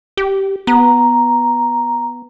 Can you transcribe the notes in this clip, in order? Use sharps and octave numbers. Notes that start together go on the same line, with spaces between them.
G4
B3 A#5